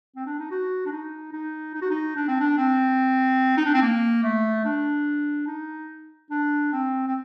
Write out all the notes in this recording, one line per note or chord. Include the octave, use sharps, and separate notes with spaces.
C4
D4
D#4
F#4
D4
D#4
D#4
D#4
F#4
D#4
D4
C4
D4
C4
D#4
D4
C4
A#3
A3
D4
D#4
D4
C4
C4